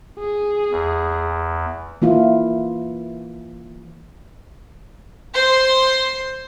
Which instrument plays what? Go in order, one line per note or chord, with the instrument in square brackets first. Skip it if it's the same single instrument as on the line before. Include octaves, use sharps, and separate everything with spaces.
[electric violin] G#4
[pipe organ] E2
[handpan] E3 A#3 E4 F4
[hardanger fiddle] C5 C6